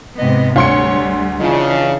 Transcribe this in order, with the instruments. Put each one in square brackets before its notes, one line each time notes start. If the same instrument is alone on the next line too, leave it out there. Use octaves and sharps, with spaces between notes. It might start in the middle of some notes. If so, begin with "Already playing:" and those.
[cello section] G#2 C3 B3 [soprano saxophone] D#5
[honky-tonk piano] D2 C6 C#7 [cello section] G3 [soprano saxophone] C#5
[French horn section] C#3 [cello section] E3 D4 [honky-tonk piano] F3 [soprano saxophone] D#4